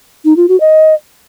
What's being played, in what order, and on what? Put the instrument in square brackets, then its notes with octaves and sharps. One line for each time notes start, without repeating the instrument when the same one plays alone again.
[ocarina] D#4
F4
F#4
D#5